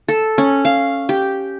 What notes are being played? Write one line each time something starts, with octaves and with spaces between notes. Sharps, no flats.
A4
C#4
F5
G4